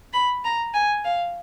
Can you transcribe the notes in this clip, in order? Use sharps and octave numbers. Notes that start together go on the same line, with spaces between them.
B5
A#5
G#5
F5